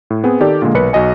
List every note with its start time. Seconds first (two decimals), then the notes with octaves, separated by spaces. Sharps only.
0.10 A2
0.24 B3 C4 G#4
0.40 D#3 G4 A4 D5
0.62 A#2 D3 G#3 A#3
0.74 B1 A#4 B4 C#7
0.93 B1 F#4 D#5 G#5